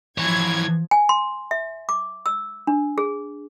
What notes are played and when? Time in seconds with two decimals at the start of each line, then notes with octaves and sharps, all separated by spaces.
0.18 E3 F3 C#5 G#6
0.91 G#5
1.09 C6
1.51 E5
1.89 D6
2.26 E6
2.67 D4
2.98 G#4